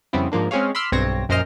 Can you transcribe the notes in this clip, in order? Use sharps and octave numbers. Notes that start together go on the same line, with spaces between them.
F2 C#3 G3 B3 C4 E4
G#2 F3 A#3 D4
G#3 C4 C#4 G#4 C#5 F5
B5 C6 D6 E6 F6
B1 G2 C4 C#5 A#6
A#1 F#2 A#4 C5 D#5 F6